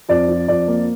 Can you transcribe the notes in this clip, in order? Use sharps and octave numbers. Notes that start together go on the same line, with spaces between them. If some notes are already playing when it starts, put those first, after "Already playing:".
F2 D5
F3
F2 D5
A#3